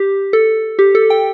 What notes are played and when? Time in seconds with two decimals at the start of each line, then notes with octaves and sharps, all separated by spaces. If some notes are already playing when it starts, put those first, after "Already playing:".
Already playing: G4
0.33 A4
0.79 G4
0.95 A4
1.10 G5